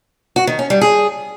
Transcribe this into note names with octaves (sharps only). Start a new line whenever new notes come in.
F#4
D#3
C#4
G3
G#4